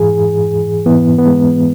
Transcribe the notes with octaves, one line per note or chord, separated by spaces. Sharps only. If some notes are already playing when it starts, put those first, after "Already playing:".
Already playing: G#2 E3 G#4
G#2 E3 B3
B3
G#3